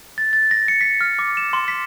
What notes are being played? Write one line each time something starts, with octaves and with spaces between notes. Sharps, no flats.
A6
A6
A#6
C#7
B6
F6
D6
E7
C6
B6